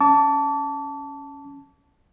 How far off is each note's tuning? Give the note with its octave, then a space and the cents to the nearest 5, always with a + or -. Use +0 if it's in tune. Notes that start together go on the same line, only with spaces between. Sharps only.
C#4 +0 A5 +0 D6 -40